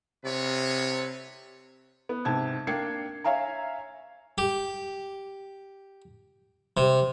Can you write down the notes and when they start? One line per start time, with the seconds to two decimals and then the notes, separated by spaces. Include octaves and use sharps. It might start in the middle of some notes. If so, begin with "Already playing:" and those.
0.25 C3 A4 B4 C#5
2.09 B3
2.25 G#2 C3 A5 G#6
2.67 A#3 D4 G5 G#6 C7 C#7
3.24 C#5 E5 F5 G#5 A#5
4.38 G4
6.77 C3